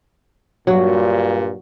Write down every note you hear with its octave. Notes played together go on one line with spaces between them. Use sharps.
G2 A#2 F#3 F#4